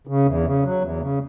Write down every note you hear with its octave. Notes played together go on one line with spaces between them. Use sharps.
C#3
E2
C#3
F#3
E2
C#3